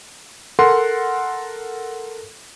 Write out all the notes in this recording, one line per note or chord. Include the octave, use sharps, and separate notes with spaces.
A4 A#4 F#5 C6